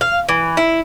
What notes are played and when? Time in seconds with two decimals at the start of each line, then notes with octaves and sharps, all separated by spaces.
0.01 F5
0.29 E3
0.57 E4